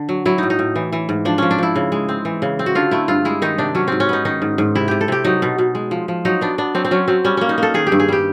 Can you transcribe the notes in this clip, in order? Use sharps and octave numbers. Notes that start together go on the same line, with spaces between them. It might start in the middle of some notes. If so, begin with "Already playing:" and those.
Already playing: D3
F#3
F#3 E4
A2 D#4
D#4
A2
E3
E3
G#2
F3 D4
F3 C#4
D4
F3 E4
C#3
G#3
C4
E3
C#3
C4
F#4
D3 F4
A3 E4
G2 F4
G#3 E4
D#3 D#4
C3 D4
F#3 C#4
G#2 C4
C#4
B3 D#4
D#3 D#4
G#2
G#2
C3 E4
C3 G4
A4
C3 G4
F#3 D#4
B2
B2
G#3
F3
F3
F#3 D#4
B3 D4
B3 D4
F#3 C4
C4
F#3 C#4
F#3 C4
G3 C#4
A#3 C#4
D#4
A#3 A4
D#3 G#4
G4
G2
G#4
G3 G4